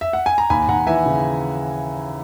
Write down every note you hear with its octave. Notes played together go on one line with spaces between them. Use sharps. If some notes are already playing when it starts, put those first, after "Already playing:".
E5
F#5
G#5
A#5
D#2 G#5 B5
D#2 F#5 A#5
E3 E5 G#5
C#3